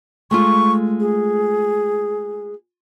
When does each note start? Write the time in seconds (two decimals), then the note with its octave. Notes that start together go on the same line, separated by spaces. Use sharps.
0.31 G#3 A3 F4 C#6
1.00 G#4